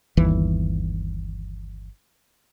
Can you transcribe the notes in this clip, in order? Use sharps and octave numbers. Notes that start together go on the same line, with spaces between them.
G1 D#2 E3